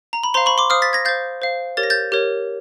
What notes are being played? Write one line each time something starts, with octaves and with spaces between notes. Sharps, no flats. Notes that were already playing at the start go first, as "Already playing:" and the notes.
A#5
B5
C5 F5 A#5 C6
B5 C#6
C6 D6
C5 F5 D#6 F6
A6 B6
G#6 A#6
C5 F5 G6 A6
C5 F5
G4 A#4 C#5 A6
A#6
G6 A6
G4 A#4 C#5